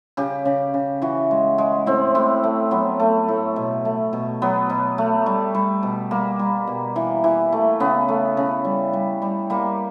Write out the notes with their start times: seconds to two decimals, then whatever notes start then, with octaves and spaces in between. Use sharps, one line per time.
0.17 C#3 G4
0.45 C#3
0.74 C#3
1.02 E3 F#4
1.31 G#3
1.58 G#3
1.86 A2 C4
2.15 A2
2.44 A3
2.71 F#3 B3
3.00 A3
3.28 A2
3.56 B2
3.85 A3
4.13 B2
4.42 F#3 B3
4.70 B2
4.98 A3
5.26 G3
5.55 G3
5.83 B2
6.11 G3 A#3
6.39 G3
6.67 B2
6.96 E3
7.24 E3
7.53 A3
7.80 C#3 B3
8.08 A3
8.37 C#3
8.65 G3
8.93 G3
9.22 G3
9.50 G3 A#3